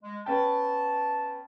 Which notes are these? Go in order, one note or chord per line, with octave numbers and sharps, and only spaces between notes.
G#3
B3 C#4 G5 A5